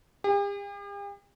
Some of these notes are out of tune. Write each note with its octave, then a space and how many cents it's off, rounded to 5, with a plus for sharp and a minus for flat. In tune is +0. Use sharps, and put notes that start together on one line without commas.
G4 +45